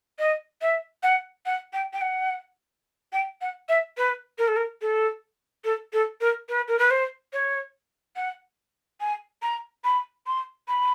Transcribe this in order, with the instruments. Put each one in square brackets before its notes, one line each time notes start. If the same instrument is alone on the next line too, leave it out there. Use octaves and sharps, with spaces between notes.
[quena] D#5
E5
F#5
F#5
G5
G5
F#5
G5
F#5
E5
B4
A#4
A4
A#4
A4
A4
A4
A#4
B4
A#4
B4
C5
C#5
F#5
G#5
A#5
B5
C6
B5